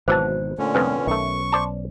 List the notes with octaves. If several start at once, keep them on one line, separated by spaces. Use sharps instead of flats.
G#1 B2 E3 F#3 C5 A5
A#2 D3 A3 C#4
C2 F2 B4
B1 D#3 A3 C#4 C#6
C5 D5 A5